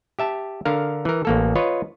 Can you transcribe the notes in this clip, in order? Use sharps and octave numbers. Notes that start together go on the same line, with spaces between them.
G4 E5 A5
D3 A#4 F5
E3 A#4
A1 A#3 A4
F4 B4 C#5 D#5